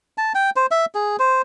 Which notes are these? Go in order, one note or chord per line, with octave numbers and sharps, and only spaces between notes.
A5
G5
C5
E5
G#4
C5